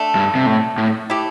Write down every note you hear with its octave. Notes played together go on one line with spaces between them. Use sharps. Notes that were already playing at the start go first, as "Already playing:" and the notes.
Already playing: D3 A3 D4
G2
C3
A2
A2
A3 E4 G4